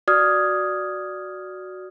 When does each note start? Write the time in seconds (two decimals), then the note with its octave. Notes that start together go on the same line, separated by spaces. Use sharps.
0.08 F#4 D5 D#6 F6 G#6